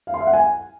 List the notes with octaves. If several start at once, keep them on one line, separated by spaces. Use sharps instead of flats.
F5
C6
E5
F#5
G#5